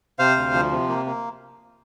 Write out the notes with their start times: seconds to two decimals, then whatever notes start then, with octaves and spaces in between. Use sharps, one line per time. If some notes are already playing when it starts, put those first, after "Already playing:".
0.19 C3 C5 F5
0.37 D2
0.54 F3
0.71 C3
0.89 A#3
1.06 A#3